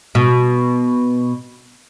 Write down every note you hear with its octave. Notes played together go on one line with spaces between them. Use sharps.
B2